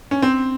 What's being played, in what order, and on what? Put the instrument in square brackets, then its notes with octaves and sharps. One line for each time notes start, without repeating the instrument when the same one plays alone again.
[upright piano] C#4
C4